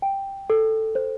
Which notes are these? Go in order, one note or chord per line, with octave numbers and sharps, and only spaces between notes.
G5
A4
C5